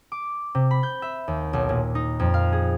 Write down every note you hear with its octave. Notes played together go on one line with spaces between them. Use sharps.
D6
C3
B5
G6
E5
D#2
B1
A#2
D#4
F2
F5
G#4